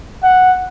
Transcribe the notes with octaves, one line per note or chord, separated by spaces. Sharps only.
F#5